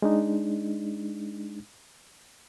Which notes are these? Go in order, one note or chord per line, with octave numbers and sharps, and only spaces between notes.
G#3 D4 D#4